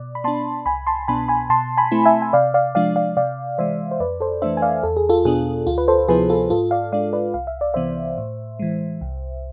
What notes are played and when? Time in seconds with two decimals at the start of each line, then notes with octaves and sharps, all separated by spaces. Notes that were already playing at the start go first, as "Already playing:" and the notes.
Already playing: B2 D5
0.15 B5
0.24 B3 D4 A5 C6
0.66 C2 G#5 B5
0.87 A5 C6
1.08 B2 B3 D4 G#5 B5
1.28 G#5 B5
1.50 B2 A5 C6
1.77 G#5 B5
1.92 A3 C4 E4
2.05 E5 G#5
2.22 G#5
2.33 C3 D5 F5
2.54 D5 F5
2.75 F3 G#3 D4 D5 F5
2.96 D5 F5
3.17 C3 D5 F5
3.58 E3 G#3 C5 E5
3.91 C5
4.00 F2 B4 D5
4.20 A4 C5
4.42 E3 A3 D4 C5 E5
4.57 G#5
4.62 D5 F5
4.83 E2 A4
4.97 G#4
5.09 F4 A4
5.25 B2 B3 D4 G#4
5.67 D2 F4
5.78 B4
5.88 A4 C5
6.08 C3 F3 B3 E4 G#4 B4
6.30 F4 A4
6.50 G#2 F4 A4
6.71 D5 F5
6.92 G#3 D4 D5 F5
7.13 B4 D5
7.34 C2 F5
7.47 E5
7.61 D5
7.74 C3 E3 B3 C5 E5
8.18 A2
8.59 E3 G#3
9.01 C2